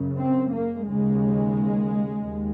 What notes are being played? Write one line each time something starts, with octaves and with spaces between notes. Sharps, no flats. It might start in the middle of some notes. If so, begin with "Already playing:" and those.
Already playing: F#2 C#3
C4
A#3
D#2 C#3 G#3
D#2